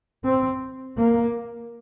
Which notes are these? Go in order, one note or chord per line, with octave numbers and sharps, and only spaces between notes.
C4
A#3